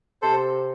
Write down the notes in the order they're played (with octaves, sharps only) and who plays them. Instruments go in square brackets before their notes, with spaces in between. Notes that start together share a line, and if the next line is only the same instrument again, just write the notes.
[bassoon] C3 [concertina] A4 C5